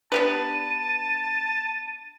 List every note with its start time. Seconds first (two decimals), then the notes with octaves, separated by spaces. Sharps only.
0.12 B3 D4 G4 B4 A5 D#7